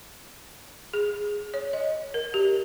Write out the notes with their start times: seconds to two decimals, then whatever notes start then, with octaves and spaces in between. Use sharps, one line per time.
0.94 G#4
1.54 C#5
1.73 D#5
2.14 A#4
2.34 G4